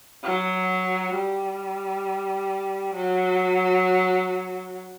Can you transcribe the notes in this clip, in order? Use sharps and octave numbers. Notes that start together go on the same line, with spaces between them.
F#3
G3
F#3